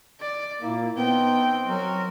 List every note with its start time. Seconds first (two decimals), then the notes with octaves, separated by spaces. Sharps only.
0.20 D5
0.62 A#2 A#3 E4
0.97 B3 C4 D#4 G5
1.66 F#3 F#4 A#4